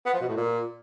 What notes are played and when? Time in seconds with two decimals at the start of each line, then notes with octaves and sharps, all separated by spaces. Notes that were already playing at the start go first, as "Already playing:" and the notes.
0.06 B3
0.14 F3
0.21 B2
0.29 A2
0.36 A#2